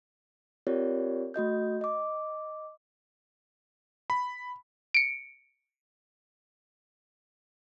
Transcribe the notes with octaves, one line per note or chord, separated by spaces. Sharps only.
C4 F4 G4 A#4 C#5 D5
A3 F#4 D#5 G6
D#5 D6
B5
C#7 D7